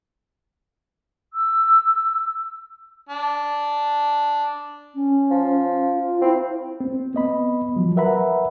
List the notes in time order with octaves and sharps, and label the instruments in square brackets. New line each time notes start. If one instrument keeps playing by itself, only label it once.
[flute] E6
[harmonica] D4
[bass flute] C#4
[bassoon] F3
[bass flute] F4
[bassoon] C4 [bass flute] E4
[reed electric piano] C4
B3 D#5 B5
F3 F#3
A#4 B4 E5 F#5 A#5 B5